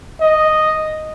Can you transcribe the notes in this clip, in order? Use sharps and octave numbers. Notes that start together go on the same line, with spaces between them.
D#5